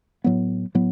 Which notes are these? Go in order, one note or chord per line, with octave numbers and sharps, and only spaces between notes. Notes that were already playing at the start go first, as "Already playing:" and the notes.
A2 F#3 B3
A2 F#3 B3